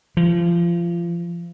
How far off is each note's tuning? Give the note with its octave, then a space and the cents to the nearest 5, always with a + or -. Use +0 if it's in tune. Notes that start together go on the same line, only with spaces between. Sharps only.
F3 -25